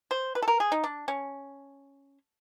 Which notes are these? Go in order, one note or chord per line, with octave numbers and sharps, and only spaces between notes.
C5
B4
A4
A#4
G#4
D#4
D4
C#4